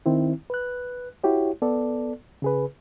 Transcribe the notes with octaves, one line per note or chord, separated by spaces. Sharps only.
D#3 C4 E4
B4 F#6
E4 F#4 G4 C#5
B3 A4 D5
C#3 G#4 B4